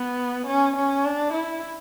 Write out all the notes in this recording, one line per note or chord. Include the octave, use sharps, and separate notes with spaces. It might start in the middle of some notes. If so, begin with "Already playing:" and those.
Already playing: B3
C#4
C#4
D4
E4